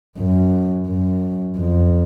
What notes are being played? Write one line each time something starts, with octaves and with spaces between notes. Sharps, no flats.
F#2
F#2
F2